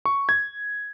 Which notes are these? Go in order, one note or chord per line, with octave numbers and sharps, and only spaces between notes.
C#6
G#6